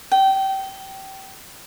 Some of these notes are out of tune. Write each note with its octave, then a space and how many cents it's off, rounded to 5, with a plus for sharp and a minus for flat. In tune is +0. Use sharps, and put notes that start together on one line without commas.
G5 -25